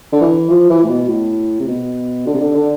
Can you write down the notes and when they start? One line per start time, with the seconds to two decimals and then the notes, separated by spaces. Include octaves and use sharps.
0.12 D3
0.21 E3
0.50 F3
0.70 E3
0.84 A2
0.89 B2
1.08 A2
1.60 C3
1.67 B2
2.26 D3
2.34 C3
2.40 D3
2.55 D3